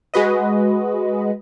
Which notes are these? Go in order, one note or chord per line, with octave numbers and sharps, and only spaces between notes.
G#3 F#4 B4 D#5